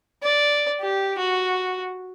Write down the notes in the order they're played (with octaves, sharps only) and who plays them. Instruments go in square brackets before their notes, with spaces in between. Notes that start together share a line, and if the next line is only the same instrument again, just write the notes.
[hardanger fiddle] D5
G4
F#4